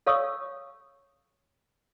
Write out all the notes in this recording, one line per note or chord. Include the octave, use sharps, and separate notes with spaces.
A4 C#5 F5 C#6 D#6 E6